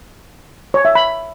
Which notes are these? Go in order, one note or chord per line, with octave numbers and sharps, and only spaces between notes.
C#5
E5
B5